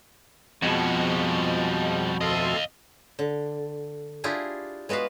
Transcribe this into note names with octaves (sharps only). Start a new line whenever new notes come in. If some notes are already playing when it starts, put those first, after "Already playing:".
F2 B2 F3 G3 G#3 F#4
D2 A4 D#5 F5 C6
D3
D4 E4 F4 G4 G#4
G#3 B3 F#4 B4 F5